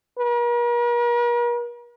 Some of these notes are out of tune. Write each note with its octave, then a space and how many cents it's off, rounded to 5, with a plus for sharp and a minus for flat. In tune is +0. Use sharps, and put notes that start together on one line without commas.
A#4 +45